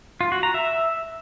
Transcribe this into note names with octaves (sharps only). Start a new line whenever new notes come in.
F4
F#4
A#5
E5